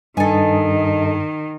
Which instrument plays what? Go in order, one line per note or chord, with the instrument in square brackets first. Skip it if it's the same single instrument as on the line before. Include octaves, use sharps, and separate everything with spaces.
[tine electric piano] G2 [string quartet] D#3 [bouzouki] A4 G#5 [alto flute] D#5